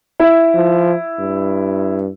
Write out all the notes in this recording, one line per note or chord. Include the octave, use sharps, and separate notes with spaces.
E4
F3
G2